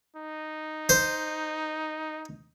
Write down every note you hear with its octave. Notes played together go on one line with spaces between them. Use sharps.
D#4
C5